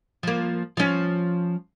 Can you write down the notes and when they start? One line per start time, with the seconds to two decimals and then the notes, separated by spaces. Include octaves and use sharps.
0.23 F3 A#3
0.77 F3 C#4